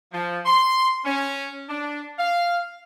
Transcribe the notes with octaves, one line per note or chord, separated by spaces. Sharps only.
F3
C6
C#4
D4
F5